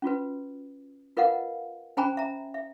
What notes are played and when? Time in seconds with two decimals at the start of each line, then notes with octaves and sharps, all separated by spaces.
0.02 C#4 F4 F#4 B4
1.17 F4 A#4 B4 D#5 F5 F#5
1.97 C#4 C5 G5 G#5 A#5 B5
2.17 E5 A#5
2.54 E5